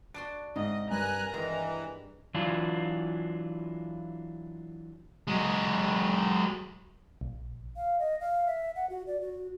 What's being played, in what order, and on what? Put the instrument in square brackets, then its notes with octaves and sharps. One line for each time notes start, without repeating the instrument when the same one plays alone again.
[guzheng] D4 F#4 C6 [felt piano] D7
[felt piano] G#2 [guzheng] C3 [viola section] D#5
[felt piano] G2 [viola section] A#4 A#5 [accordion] G#5 F#6
[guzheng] G2 D#3 G#3 [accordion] E3 [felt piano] A#6
[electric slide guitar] E3 F#3 D4 F4
[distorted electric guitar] F#3 G#3
[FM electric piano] A#1
[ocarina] F5
D#5
F5
E5
F#5
F#4
D5
F#4